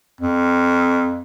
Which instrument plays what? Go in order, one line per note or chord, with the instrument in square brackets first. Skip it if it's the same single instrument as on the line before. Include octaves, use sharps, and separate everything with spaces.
[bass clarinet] F2